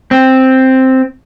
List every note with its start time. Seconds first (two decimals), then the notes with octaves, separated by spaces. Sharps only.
0.11 C4